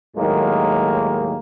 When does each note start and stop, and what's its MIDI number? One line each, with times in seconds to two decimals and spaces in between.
0.17 1.36 39
0.17 1.36 45
0.17 1.36 51
0.17 1.36 54
0.17 1.36 56
0.17 1.36 58